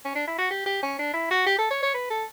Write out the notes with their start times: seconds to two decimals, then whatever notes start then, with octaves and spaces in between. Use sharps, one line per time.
0.05 C#4
0.15 D4
0.27 E4
0.38 F#4
0.50 G4
0.66 G4
0.83 C#4
0.99 D4
1.14 E4
1.31 F#4
1.46 G4
1.58 A4
1.71 C#5
1.83 C#5
1.94 B4
2.10 A4